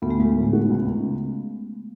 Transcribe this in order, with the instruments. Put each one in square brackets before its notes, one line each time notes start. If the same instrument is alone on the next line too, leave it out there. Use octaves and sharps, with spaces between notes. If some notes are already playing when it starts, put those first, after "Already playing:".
[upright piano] D2 [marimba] B3
[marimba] A3
[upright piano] D2 [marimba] G#3
[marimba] A3
[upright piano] A2
F#4
C#2
C#2